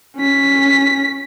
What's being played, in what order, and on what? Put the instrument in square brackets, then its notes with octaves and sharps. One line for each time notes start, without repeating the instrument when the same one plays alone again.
[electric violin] C#4 B6